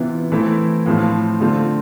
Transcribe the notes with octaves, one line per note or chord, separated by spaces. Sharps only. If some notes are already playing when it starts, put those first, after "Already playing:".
Already playing: C3 E3 B3 F4
E3 A3 C4 E4
A2 F3 C4 F4
D3 A3 C4 F4